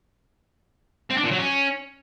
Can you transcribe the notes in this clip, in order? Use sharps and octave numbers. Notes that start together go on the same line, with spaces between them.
C4
D4
A#2
F#3
C#4